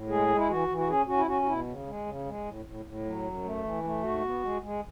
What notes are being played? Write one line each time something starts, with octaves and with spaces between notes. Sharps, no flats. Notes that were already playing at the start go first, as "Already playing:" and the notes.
Already playing: A2
G#3 G#4
G#3
E4
E3 F#4
E3
F#4
C#4 G#4
C#4 F#4
E4
C#4 F#4
F#4
B2 E4
C#3
G#3
C#3
G#3
A2
A2
A2
F#3
F#2
A3
E3
A3
G#2 F#4
B3
G#3
G#3